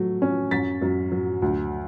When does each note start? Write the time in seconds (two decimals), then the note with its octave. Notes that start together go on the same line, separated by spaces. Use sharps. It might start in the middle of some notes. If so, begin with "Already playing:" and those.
Already playing: F#3 A3
0.22 C#4
0.51 F#2 A6 B6
0.82 F#2
1.12 F#3
1.42 D2